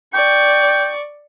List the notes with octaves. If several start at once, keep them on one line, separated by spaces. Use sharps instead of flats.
D5 G5 C#6